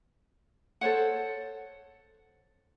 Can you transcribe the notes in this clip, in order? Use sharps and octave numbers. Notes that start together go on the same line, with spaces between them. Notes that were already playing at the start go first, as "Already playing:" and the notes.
A4 C5 C#5 F#5